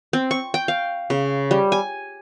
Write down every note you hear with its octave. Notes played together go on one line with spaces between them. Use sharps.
C4
C#6
G5
F5
C#3
G3
G#5